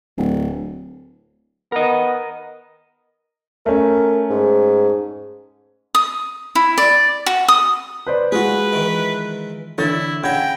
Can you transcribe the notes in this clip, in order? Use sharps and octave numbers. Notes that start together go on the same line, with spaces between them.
D1
B3 A#4 D#5
A3 C#4 A#4
G#2
D#6
E4
D5
F#4
D#6
B4 C5 D5
G#3 F4 F#4 G#4 B4
D#3 E3
D3 E3 E4 C#5 A6
C#3 F#5 G5 A#5 B5 G#6